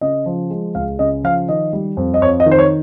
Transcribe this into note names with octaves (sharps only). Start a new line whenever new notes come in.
C#3 D#5
F3
G#3
C#2 F5
C#3 D#5
F3 F5
D#3 D#5
G3
F2
D#5
F2 C#5
D#5
D#3
C5
C#5